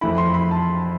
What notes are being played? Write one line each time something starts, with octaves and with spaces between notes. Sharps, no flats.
F2 E3 A3 E4 B5
C6
B5
A5